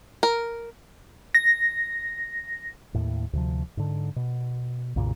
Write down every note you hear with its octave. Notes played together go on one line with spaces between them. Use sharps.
A#4
A#6
D#2 A2
D2 C3 F3
G#2 D3
B2
B1 F#2 A#2 C#3